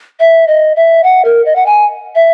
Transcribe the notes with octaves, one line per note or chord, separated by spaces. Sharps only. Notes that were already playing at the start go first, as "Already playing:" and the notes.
E5
D#5
E5
F#5
A#4
D#5
F#5
G#5
E5